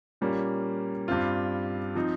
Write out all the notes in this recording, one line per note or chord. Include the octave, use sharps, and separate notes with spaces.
A#2 G3 A#3 C#4
G2 G3 C4 F4
F3 C4 D#4